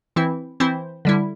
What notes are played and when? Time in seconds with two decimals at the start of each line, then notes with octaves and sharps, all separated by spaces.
0.16 E3 C4 E4
0.60 E3 C4 E4 C5
1.05 D3 G3 E4